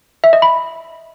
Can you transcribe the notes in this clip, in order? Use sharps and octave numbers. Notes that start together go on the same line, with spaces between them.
E5
D#5
B5